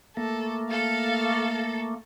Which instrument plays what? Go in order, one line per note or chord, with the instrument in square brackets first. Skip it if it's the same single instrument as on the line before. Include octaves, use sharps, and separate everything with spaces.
[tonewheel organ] A3 A#3 [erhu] A4
[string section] A4 [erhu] F5